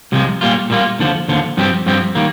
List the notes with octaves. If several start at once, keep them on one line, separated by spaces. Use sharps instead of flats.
C2 C3 F3 G#3
A#2 G3 A#3 F4
A#2 G3 A#3 F4
D#2 D3 F3
D#2 D3 F3
G2 F3 C4 G4
G2 F3 C4 G4
D#3 G3 A#3